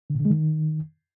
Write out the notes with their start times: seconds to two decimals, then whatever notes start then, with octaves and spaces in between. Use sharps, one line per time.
0.10 D3
0.15 A#2
0.20 D3
0.25 G#3
0.30 D#3